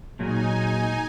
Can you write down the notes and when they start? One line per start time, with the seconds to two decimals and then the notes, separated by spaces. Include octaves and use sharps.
0.19 A#2 F#3 G#3 D#4 G#5